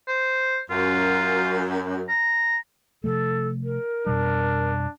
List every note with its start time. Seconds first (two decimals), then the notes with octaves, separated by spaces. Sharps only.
0.08 C5
0.70 F#2 F4
2.09 A#5
3.04 C3 F3 A3 A4
3.64 A#4
4.07 F2 B2 G3 D4